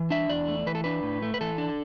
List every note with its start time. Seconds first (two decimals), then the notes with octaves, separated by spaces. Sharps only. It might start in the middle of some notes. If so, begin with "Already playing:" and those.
Already playing: E3
0.10 D4 E5
0.29 E2 D5
0.48 A3
0.66 E3 B4
0.75 A4
0.84 D4 B4
1.03 A2
1.22 A3
1.34 B4
1.41 E3 A4
1.58 D4